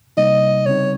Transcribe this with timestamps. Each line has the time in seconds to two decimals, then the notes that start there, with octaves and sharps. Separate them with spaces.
0.17 C3 G3 A#3 D#4 D#5
0.66 C#3 G3 C4 D#4 C#5